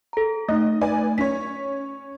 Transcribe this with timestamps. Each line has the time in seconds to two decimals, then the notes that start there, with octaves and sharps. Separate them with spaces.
0.13 A4 A#5
0.48 A3 D#4 D#5
0.81 B4 D5 G#5
1.18 C#4 C#5 B6